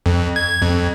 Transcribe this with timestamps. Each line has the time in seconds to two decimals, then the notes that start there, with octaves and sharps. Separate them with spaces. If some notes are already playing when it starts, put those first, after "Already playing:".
0.06 F2
0.36 G#6
0.62 F2